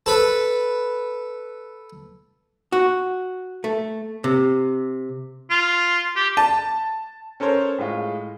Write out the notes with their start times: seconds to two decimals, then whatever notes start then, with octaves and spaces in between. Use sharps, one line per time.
0.06 A4 B4
2.72 F#4
3.64 A3
4.24 C3
5.51 F4
6.16 G4
6.37 A5
7.40 C#4 A4 A#4 C5 C#5
7.78 A2 G#3 F4